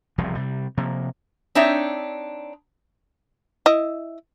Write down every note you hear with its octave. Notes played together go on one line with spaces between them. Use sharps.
E1 C2 C3 F3
C3 G3
C3 F3 A#3
C4 D4 D#4 C#5 E5
E4 D#5